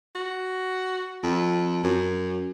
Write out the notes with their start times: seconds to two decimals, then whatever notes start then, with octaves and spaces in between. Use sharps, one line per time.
0.15 F#4
1.23 F2
1.83 F#2